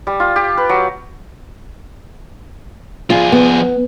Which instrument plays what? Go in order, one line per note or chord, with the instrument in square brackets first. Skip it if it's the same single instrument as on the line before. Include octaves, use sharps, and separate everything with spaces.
[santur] G3
F4
G4
B4
F#3
[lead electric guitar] F3 G#4 [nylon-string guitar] F4
[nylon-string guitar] B3